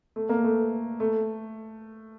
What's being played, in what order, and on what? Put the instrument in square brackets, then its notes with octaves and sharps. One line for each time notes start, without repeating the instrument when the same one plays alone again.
[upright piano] A3
A#3
A3
A3